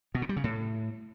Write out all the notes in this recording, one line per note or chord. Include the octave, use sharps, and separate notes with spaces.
B2
C#3
G3
C#3
A2